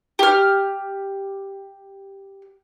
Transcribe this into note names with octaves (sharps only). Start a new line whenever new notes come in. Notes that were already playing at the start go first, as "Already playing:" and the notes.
G4 F6